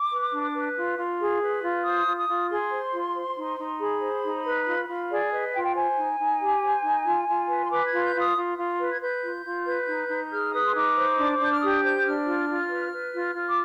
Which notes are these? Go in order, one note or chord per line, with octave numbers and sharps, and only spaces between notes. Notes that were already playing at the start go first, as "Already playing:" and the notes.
Already playing: D6
B4
D4
B4
F4
F4
G#4
B4
F4
C5 D#6
F4
D#6
F4
G#4 C6
C5
F4
C5
D#4
D#4
G#4 B5
C5
D#4
B4
F4
F4
G#4 D5
B4 D#5
F4 G5
G5
C5 G#5
D#4
D#4
G4
C5
D#4
F4
F4
B4
C6
B4 D6
G#6
F4
G6
F4
D#6
F4
F4
B4
G#6
B4 G6
F4
F4
B4
D#4
D#4
G#4 F6
B4 D#6
C6
D#4 D6
C5
D4
D4 G6
F6
G4 D#6
C5 G6
D4 F6
F4
F4
B4
B4
F4
F4
D6